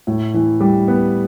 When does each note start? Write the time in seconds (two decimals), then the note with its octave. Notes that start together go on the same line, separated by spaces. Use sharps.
0.07 A2
0.34 E3
0.61 G3
0.88 B3